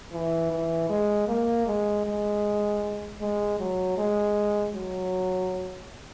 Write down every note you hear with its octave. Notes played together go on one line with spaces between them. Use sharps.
E3
E3
G#3
A#3
G#3
G#3
G#3
F#3
G#3
F#3